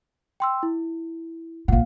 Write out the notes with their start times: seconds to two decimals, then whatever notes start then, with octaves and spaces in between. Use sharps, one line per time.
0.40 G5 C6 E6
0.63 E4
1.68 A#1 A#2 F5 F#5